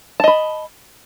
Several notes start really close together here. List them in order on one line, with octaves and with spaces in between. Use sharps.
A5 D#5 B5